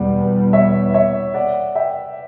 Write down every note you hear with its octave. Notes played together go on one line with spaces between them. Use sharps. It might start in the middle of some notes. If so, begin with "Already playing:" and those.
Already playing: E2 B2 G3 B3 D5 F#5
C#5 E5
C#5 E5
D5 F#5
E5 G5